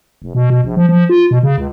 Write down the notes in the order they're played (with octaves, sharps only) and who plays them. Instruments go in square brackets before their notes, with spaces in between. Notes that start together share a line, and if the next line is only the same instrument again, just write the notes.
[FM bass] F1
B2
B2
A#1
F3
F3
F4
B2
C#3
C#2